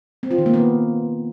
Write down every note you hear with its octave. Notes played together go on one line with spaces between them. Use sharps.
C4
F4
D#3
A#3
B3